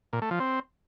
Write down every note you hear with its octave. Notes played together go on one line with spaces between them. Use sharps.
A#2
A3
F3
C4